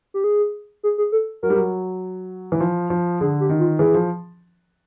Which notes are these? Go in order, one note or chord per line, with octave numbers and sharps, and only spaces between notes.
G4
G#4
G#4
G#4
A4
F#3 A#4
G3
F#3
E3
F3
F3
D3 G#4
G4
D#3
F4
E3 G#4
F3